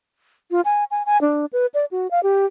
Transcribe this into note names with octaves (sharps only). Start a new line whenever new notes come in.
F4
G#5
G#5
G#5
D4
B4
D5
F#4
F5
G4